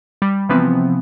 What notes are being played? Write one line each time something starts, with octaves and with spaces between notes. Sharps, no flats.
G3
C3 E3 F3 B3 C4